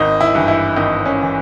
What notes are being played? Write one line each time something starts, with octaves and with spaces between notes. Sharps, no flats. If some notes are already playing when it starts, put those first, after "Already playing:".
Already playing: G#1 D#4
E4
G2 E3
E4
G#1 D#4
C#4
E3